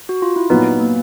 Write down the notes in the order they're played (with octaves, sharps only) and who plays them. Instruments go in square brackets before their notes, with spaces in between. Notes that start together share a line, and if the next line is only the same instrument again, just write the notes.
[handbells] F#4
F4
E4
[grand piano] A#2 F#3 B3 [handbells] D#4
[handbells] A#3